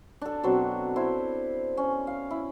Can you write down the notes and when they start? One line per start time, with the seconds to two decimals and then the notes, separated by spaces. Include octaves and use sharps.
0.21 D4 A4
0.43 B2 F#3 C4
0.96 E4 C5
1.77 C#4
2.07 F5
2.31 E4